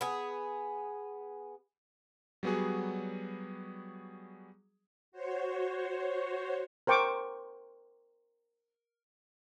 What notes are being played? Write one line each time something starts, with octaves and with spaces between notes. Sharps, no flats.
B3 G#4
F#3 G3 B3 F#4 G#4
F#4 C5 C#5
A#4 C5 G5 C#6 D6